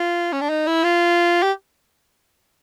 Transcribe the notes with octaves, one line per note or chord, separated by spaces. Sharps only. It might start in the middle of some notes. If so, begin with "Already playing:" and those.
Already playing: F4
C#4
D4
D#4
E4
F4
G4